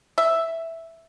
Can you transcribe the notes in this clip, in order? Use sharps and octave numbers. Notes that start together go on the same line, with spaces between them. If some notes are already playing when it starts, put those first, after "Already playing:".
E5